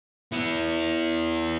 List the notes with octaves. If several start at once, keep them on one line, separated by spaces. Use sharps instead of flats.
B3 E4